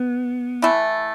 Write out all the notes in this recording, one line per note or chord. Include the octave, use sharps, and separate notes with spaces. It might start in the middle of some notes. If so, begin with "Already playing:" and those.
Already playing: B3
E3 A3 E4